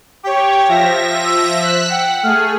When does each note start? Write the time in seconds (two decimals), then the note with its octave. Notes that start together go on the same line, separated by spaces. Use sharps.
0.23 G4 C#5 G5
0.68 F3 E5 A#6
1.25 E6
1.61 C5 E6 F#6 B6
1.90 F#5 G5
2.23 A3 G#4 F6